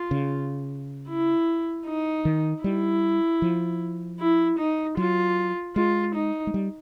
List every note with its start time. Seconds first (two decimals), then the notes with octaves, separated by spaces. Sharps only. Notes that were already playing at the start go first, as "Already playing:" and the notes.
Already playing: F4
0.11 C#3
1.08 E4
1.86 D#4
2.25 D#3
2.64 G3 E4
3.42 F3
4.20 E4
4.59 D#4
4.97 F#3 F4
5.76 G#3 F4
6.15 D#4
6.47 G#3
6.54 G3